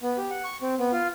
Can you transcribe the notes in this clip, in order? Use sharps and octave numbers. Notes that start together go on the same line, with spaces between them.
B3
G4
F#5
C#6
C4
B3
F4